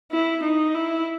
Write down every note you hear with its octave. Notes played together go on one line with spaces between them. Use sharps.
E4
D#4
E4